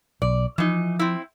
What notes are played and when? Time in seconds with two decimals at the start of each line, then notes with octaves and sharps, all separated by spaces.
0.22 B1 D5
0.58 E3 F3 D#4
0.99 C4 E4